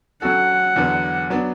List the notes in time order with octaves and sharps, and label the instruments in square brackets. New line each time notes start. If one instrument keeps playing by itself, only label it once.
[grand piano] F#3 C#4 F#4 A4 [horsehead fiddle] F#5
[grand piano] E2 D3 F#3 B3
F#3 B3 D4